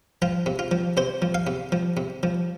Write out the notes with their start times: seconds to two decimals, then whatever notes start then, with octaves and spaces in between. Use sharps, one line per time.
0.22 F3 F4
0.46 C3
0.59 F4
0.71 F3
0.97 C3 C5
1.22 F3
1.35 F5
1.47 C3
1.72 F3
1.97 C3
2.23 F3